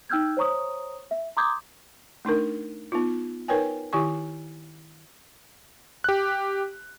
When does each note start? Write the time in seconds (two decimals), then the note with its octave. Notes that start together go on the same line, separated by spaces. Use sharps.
0.09 D#4 G5 E6 F6 G6 G#6
0.37 C5 C#5 A#5 C#6 D#6
1.11 E5
1.37 A#5 C6 D6 D#6 G6 G#6
2.25 A3 D4 D#4 A#4
2.92 B3 D#4 F4
3.48 D#4 A#4 B4 C#5 G5 G#5
3.93 D#3 E4 G4 G#5 C#6
6.04 G4 F#6